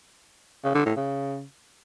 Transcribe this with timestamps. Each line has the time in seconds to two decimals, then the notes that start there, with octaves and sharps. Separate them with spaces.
0.64 C#3
0.75 D3
0.85 A2
0.96 C#3